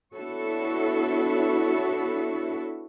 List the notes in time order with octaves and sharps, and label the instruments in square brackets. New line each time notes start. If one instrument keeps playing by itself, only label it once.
[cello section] B3 D4 E4 F#4 A4 C#5